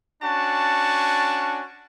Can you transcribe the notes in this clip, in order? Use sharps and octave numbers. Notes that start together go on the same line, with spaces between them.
C#4 D4 F#4 A5